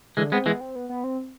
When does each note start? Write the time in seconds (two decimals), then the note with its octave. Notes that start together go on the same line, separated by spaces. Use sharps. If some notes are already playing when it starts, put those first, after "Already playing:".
0.17 D3 E3 G#3
0.32 G#3 B3 C4
0.46 E3 G#3 B3
0.61 C4
0.76 B3
0.89 B3
1.04 C4